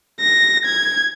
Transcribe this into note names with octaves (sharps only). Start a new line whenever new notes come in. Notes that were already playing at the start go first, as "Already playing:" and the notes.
A#6
G#6